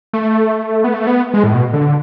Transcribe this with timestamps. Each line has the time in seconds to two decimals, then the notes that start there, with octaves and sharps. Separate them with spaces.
0.13 A3
0.84 B3
0.94 A3
1.07 B3
1.34 G#3
1.44 A2
1.54 B2
1.73 D3